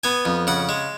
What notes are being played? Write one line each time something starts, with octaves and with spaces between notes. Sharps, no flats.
B3 G#5
F2
C#3 F#5
G#3